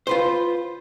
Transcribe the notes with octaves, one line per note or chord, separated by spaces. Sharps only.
F4 B4 C5